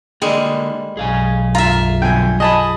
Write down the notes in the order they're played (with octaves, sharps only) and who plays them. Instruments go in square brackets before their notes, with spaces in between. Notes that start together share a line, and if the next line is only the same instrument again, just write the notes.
[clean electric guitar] D3 A#3 [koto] G3 G#3
[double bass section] B1 F#2 [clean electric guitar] G#4 F5 G#5
[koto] F4 E5 [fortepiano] A#5
[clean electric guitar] G2 B2 D3 [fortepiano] G5 G#5
[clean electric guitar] G#4 [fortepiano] D#5 A5 B5